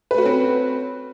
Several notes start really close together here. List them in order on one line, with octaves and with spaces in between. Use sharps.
B4 A3 F#4 C#4 C4